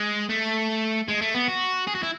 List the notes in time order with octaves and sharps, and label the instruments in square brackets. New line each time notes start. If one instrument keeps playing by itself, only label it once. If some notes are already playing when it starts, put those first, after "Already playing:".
Already playing: [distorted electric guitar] G#3
A3
G#3
A3
B3
F#4
G#4
F#4
E4